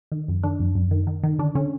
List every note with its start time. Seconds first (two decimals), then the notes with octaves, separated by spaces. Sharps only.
0.12 D#3
0.28 F#2
0.43 D#3 D4
0.60 F#2
0.75 F#2
0.91 D#3
1.07 D#3
1.23 D#3
1.39 D3 D4
1.55 D3 C#4